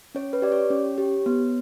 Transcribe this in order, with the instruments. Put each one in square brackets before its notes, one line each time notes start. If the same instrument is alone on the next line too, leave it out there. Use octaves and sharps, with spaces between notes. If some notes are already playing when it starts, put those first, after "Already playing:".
[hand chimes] C#4 C#5
B4
G4 D5
C#5
C#4
G4
B3